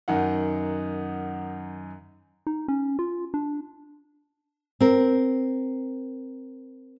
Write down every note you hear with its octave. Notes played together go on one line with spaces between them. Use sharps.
F#2 D#3 D#4 F#5
D#4
C#4
F4
D4
C4 A#4